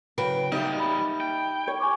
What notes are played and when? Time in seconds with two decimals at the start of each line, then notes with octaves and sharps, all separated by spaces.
0.18 C#3 F#3 B4 G5
0.52 A#2 G3 D#4 G4 D#5 E5
0.80 B5
1.20 G5
1.67 G4 C#5
1.80 G#5 C#6 D6